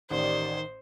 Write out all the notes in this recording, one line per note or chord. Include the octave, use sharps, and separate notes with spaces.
A1 D#3 G4 C5 D5